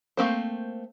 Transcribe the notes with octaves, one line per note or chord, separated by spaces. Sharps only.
A3 A#3 C4 C5